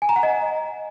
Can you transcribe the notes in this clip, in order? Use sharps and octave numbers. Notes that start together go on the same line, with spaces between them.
G#5
A#5
F#5
D#5